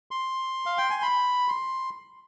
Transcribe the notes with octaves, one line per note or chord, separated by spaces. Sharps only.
C6
F5
G5
G#5
B5
C6